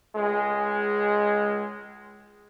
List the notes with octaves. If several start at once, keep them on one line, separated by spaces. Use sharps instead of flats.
C#2 G#3